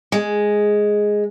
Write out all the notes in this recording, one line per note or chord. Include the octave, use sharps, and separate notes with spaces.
G#3